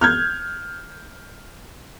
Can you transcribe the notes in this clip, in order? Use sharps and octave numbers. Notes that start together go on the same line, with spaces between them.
F6 G6 G#6